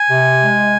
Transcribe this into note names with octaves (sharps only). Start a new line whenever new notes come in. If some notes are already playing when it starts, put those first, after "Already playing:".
Already playing: G#5
C3
G#3